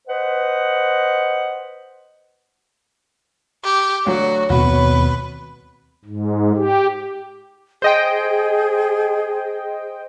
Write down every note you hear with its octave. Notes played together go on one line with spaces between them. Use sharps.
B4 C5 D#5 F#5
G4
D2 F#3 F#4 C#5
D#2 B2 C4 F#4 B4
G#2
G4
G#4 C5 D#5 G5